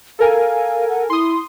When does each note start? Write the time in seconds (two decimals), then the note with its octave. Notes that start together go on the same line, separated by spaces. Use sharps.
0.19 A4 A#4 F5 G#5
0.89 F#5
1.10 E4 C6 D#6